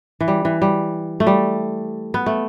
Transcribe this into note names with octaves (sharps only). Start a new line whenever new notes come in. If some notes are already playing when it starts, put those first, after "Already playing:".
E3
G3
E3
G3
A3
G3
B3
A3